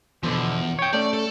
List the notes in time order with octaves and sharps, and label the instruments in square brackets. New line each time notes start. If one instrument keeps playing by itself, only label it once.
[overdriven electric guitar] E2 [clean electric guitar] B2 D3 F3
[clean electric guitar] C#5 G5
[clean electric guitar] A3 C#4 [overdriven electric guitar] D5
[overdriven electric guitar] A4